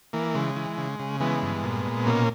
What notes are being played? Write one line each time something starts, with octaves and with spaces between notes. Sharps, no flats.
E3 A#3
C#3 G#3
E3
C#3
C#3
E3 G#3 B3
G2
A#2
A#2
B2 A#3 C#4